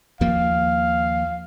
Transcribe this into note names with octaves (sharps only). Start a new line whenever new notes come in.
D#2 F3 A#3 F5